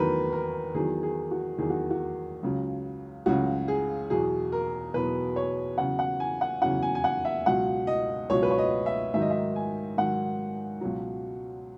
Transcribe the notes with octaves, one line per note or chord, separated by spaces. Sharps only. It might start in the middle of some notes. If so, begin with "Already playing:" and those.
Already playing: E2 D#3 F#3 A#4 B4
A#4
E2 D#3 F#3 G#4
G#4
F#4
E2 D#3 F#3 G#4
F#4
F#4
C#2 C#3 F#3
C#2 C#3 F#3 F#4
G#4
E2 B2 F#3 G#4
A#4
E2 B2 F#3 B4
C#5
E2 C#3 F#3 F#5
F#5
G#5
F#5
E2 C#3 F#3 F#5
G#5
G#5
F#5
E5
C#2 B2 F#3 F#5
D#5
C#2 B2 F#3 C#5
B4
C#5
D#5
E5
G#2 D#3 F#3 E5
D#5
E5
G#5
G#2 D#3 F#3 F#5
C#2 B2 F#3